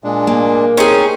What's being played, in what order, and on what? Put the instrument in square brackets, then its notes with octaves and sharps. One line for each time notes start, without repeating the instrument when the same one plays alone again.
[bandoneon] A#2 G#3 D4
[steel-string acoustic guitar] A#3
[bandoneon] C4 D#4 C6 [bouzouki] C#4 G#4